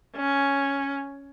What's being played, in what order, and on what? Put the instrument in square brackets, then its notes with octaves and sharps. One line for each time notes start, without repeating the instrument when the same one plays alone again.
[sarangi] C#4